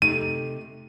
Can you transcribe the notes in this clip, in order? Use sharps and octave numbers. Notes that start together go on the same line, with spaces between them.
C3 A3 D#4 D#7